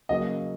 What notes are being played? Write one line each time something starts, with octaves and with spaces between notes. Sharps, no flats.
C#3 F#3 A#3 D#5